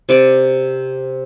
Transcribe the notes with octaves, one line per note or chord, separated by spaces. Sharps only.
C3 D5 D6